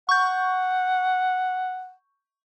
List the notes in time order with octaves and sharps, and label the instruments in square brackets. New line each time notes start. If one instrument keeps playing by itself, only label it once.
[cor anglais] F#5 [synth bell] C#6 G6